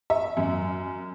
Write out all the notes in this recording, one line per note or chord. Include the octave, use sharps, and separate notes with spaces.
E5
F#2